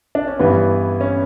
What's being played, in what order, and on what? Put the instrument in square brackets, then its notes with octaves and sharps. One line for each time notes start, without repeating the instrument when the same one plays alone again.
[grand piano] D4
C#4
G2 E3 G3 B3
C#4